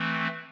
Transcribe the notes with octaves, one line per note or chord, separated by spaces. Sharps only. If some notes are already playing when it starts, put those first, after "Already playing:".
Already playing: E3 A3 C4